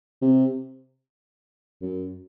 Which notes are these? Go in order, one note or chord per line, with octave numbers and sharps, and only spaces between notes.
C3
F#2